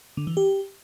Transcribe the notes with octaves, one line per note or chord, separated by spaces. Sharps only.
D3
E3
G4